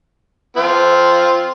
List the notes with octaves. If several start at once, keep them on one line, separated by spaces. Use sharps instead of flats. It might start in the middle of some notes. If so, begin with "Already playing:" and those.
C4 F4